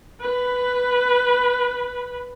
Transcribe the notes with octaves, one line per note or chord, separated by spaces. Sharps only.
B4 B5